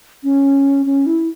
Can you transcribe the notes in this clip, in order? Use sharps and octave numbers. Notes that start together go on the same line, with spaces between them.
C#4
C#4
E4